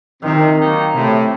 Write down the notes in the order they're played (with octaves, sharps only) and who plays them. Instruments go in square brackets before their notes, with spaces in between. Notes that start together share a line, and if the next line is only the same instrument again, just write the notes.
[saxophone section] C3 [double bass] D#3
[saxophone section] D#3 F#3 A#3 D#4
[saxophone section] A2 [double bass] C3